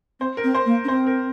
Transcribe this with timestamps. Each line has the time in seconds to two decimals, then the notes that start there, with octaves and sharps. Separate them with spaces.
0.20 C4 C5
0.37 A#4
0.44 C4
0.55 C5
0.65 A#3
0.84 C#4
0.88 C4 C5
1.06 A#4